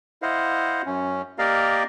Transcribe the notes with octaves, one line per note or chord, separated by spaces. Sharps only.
E4 C5 D#5 F5 F#5
F#2 C#4
A#3 G4 A#4 D5 D#5 F5